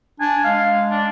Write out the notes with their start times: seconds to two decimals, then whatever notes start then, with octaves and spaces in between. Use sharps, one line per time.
0.20 D4 G#5
0.44 G#3 F5
0.91 D4